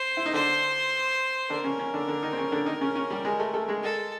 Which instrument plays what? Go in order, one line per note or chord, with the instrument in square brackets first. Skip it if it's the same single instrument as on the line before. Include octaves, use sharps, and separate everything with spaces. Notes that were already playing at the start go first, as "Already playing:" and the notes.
Already playing: [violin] C5
[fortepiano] E4
D#4
[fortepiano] D3 D4 [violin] C5
[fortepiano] D3 D4 [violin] A#4
[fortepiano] C#3 C#4
C#3 C#4
D3 D4
D3 D4
D#3 D#4
C4
C#3 C#4
D3 D4
D#3 D#4
C#3 C#4
C#3 C#4
G3 G4
G#3 G#4
A3 A4
A3 A4
G#3 G#4
[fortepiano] G#3 G#4 [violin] A4